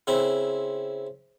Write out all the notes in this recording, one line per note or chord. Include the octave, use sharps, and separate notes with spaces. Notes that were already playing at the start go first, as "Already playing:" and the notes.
C#3 C4 E4